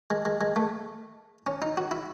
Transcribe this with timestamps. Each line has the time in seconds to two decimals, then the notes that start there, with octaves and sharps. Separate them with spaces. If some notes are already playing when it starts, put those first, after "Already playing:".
0.10 G#3
0.25 G#3
0.41 G#3
0.56 A3
1.47 C#4
1.62 D#4
1.77 F#4
1.91 E4